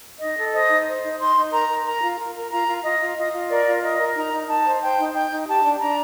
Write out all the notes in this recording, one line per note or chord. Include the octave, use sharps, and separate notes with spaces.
D#4 D#5
A4
C5 D#5
D#4
C5
D#4
D#4 C6
D#4
A#4 A#5
A#4
A#4 A#5
F4
A#4
A#4
F4 A#5
F4
F4 D#5
F4
F4 D#5
F4
A#4 D5
F4
A#4 D#5
A#4
D#4 A#5
D#4
D#4 A5
C5
C5 G5
D#4
D#4 G5
D#4
G4 A5
D4
D4 A#5